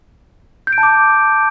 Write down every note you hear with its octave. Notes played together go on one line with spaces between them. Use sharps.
G6
D7
A5
D6